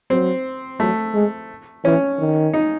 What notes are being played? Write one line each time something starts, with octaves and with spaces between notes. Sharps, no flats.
F#3 C4
F#3 A3
G#3
E3 C#4
D#3
D#4